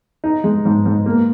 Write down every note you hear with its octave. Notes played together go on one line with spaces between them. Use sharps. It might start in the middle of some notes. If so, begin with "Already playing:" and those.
D#4
G#3
G#2
G#2
A#3